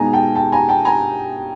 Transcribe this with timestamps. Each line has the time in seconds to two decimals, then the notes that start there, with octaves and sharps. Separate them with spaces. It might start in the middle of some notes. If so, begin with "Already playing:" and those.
Already playing: B2 G#3 B3 D#4 G#5 A#5
0.13 G5 A5
0.35 G5 A5
0.52 G#5 A#5
0.69 G5 A5
0.85 G#5 A#5